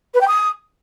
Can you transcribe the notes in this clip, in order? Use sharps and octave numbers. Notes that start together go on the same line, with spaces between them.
B4
G5
D#6